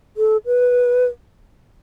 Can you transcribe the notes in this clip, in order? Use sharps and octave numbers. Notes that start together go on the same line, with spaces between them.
A4
B4